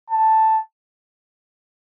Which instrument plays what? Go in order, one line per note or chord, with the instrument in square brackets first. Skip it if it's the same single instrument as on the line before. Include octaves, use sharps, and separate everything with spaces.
[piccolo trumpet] A5